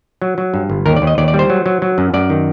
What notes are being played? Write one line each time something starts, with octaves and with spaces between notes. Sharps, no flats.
F#3
F#3
G2
G1
D#2 A#4
D5
D#2
D#5
D#2 D5
D5
G3
C5
F#3
F#3
F#3
F#2
F#2 D5
D#3